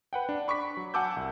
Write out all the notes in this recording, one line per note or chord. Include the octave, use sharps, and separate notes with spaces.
B4 F#5 G5
D4
B5 C#6 D6 B6
F#3
F#5 G#5 A5 D6 E6 G6
C2